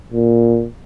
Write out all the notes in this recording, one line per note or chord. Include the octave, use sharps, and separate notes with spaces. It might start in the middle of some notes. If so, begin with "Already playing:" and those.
A#2